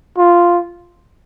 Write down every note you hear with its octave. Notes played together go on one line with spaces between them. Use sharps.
F4